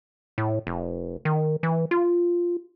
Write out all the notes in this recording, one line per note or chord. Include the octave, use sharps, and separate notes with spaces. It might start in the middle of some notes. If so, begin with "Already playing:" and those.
A2
F1
D#3
E3
F4